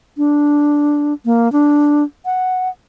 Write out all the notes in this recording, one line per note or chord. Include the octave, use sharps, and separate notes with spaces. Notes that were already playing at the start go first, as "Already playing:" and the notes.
D4
A#3
D4
F#5